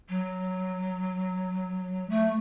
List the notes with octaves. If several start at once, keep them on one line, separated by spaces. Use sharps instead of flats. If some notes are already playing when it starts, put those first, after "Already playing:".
F#3
A3